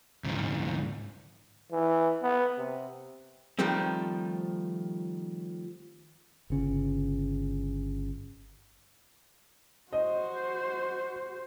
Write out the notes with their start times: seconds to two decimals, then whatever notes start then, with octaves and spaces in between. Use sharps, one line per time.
0.24 D2 G#2
1.72 E3
2.22 B3
2.58 C3
3.59 D#3 F3 G3 A3 C4
6.50 G1 C#3
9.93 F#4 C5 D#5